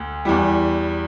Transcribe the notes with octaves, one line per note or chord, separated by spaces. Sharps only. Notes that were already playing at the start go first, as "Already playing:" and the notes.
Already playing: D2
E2 E3 G3